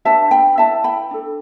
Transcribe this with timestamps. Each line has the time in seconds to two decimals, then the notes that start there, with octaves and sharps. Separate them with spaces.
0.05 D4 G4 B4 E5 A5
0.31 G5 B5
0.58 E4 B4 E5 A5
0.84 G5 B5
1.11 D4 A4